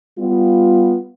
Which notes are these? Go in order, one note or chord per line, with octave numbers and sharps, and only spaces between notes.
G3 B3 F4